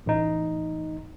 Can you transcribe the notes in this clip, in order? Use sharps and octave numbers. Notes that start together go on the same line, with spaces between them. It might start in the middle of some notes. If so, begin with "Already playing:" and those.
A1 D#4